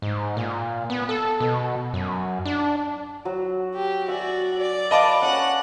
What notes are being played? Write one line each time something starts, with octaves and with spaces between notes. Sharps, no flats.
G#2
A#2
B3
A4
B2
F#2
D4
F#3 F#4
G4
F#4 D5 E5 G#5
D5
B4 D#5 F5 A5 D6
C#4 C#5 F#5